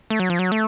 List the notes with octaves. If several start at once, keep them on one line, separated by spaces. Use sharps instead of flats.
A3
F#3
F3
F#3
A3